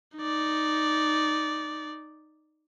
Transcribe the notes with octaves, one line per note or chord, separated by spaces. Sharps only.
D#4 D5